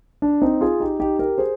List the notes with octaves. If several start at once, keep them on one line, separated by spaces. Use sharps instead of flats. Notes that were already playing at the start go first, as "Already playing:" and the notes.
D4
C4 D#4
F4 G#4
D#4 G4
D#4 G4
G4 A#4
G#4 C5